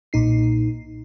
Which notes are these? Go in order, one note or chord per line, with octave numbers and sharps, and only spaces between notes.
B1 A#2 D#4 C7